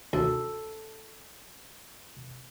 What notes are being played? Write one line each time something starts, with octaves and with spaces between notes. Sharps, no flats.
D2 A4